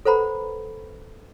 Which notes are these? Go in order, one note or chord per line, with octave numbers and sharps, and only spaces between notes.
A4 B4 C5 F#5 A#5 B5